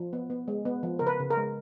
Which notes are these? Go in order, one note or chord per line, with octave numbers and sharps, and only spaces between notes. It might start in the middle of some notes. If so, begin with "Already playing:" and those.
Already playing: F3
B3
B3
G#3
B3
F3
C#3 A#4
B4
C#3
A#4
G#3